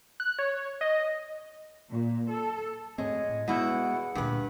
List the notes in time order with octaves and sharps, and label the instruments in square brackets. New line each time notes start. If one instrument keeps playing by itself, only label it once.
[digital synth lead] F#6
C#5
D#5
[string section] A#2
A4
[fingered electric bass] G#2 A3 C4 [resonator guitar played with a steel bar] G#3 [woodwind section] C#5 D#5
[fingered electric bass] A2
[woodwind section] E2 [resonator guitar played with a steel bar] B2 E4 [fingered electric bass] G#3 A#3 B3 [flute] F#5
[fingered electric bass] D2 A#2 [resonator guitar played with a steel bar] G2 B4